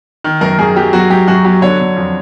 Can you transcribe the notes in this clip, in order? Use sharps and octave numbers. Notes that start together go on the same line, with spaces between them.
D#3
F#2 A#4
F#2 G#4
F#3 G4
F#3 F#4
F#2 G4
F#2 F#4
F#3 G4
D3 C#5
D3
F2